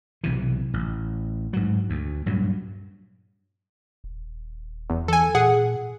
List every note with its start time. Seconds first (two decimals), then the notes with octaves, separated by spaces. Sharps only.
0.24 B1 C3 E3
0.74 A1
1.53 G#2 F#3
1.90 D2
2.26 G2 A#2 F#3
4.04 D#1
4.90 E2
5.08 E3 A4 G#5
5.35 A#2 G#4 F#5